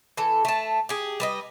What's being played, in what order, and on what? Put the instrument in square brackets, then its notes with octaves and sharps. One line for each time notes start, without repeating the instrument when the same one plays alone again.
[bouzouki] E3 A4
A3 A5
G4 G#4
G3 B4 D#5